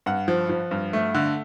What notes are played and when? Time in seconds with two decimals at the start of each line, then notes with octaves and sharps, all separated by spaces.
0.06 G2 F#5
0.28 F3
0.49 F3
0.71 G2
0.93 A3
1.14 D3